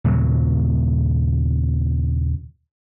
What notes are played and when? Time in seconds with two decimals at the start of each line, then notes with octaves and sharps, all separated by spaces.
0.04 D#2 A#2 C#3 F#3